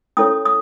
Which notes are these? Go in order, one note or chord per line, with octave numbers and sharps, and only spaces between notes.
C#4 E4 A4 C#5 D#6
D#6